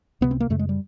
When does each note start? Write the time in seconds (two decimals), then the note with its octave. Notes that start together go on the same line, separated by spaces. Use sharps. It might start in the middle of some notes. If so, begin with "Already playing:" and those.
0.21 C#2 C3 B3
0.31 C4
0.40 A#3
0.50 F#2 C#3 A3
0.59 G#3
0.69 G3